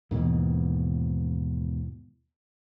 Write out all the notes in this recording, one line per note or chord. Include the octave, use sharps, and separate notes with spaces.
D#2 G#2 B2 E3